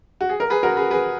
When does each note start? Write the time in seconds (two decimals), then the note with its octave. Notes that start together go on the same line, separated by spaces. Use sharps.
0.21 F#4
0.29 G#4
0.40 A#4
0.50 G#4 B4
0.63 F#4 A#4
0.77 G#4 B4
0.91 G#4 B4